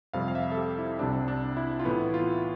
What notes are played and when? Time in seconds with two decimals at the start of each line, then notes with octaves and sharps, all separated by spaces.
0.13 F2 C3 G3 C4 F5
0.28 F5
0.35 E5
0.52 A4
0.57 G4
0.78 E4
0.99 C2 C3 G3 C4 D4
1.28 D4
1.57 E4
1.79 F4
1.85 A2 E3 B3 E4
2.14 F4